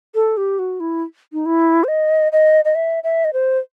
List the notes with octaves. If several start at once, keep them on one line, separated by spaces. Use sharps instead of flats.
A4
G4
F#4
E4
D#4
E4
C5
D#5
D#5
D#5
E5
E5
D#5
C5